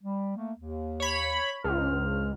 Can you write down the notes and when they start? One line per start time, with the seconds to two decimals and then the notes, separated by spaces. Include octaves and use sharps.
0.02 G3
0.36 A3 A#3
0.58 D#2
1.00 C#5 B5
1.64 C#2 G2 C5 F6